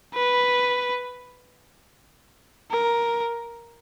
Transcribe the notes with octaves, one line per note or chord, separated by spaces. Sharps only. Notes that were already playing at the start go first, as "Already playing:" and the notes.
B4
A#4